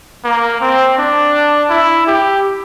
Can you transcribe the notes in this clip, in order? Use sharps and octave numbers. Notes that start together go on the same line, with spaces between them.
A#3
C4
D4
E4
G4